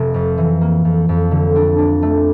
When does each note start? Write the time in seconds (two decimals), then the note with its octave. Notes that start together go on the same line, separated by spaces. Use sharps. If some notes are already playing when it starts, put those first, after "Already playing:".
Already playing: F1
0.14 F2
0.38 E3
0.61 A#3
0.85 F2
1.09 F2
1.31 D3
1.56 D4
1.79 D4
2.03 A3